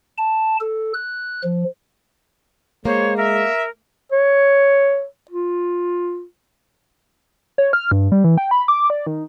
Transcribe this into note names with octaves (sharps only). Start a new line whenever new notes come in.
A5
A4
F#6
F3
G#3 A#3 C5 C#5
A#4 E5
C#5
F4
C#5
F6
G2
G3
E3
G5
B5
D6
D5
D#3